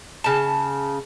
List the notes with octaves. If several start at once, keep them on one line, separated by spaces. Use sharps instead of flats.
C#3 A5